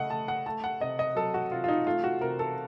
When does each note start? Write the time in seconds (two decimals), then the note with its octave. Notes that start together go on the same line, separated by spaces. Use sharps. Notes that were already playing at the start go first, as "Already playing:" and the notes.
Already playing: C#3 A3 D#5 F#5
0.10 A3 A5
0.28 F#5
0.46 A3 A5
0.64 F#5
0.80 C3 D#5
0.99 D#5
1.15 F#3 A4
1.34 F#4
1.51 C3 F4
1.64 F4
1.68 D#4
1.87 A3 F4
2.04 F#4
2.21 C3 A#4
2.39 A4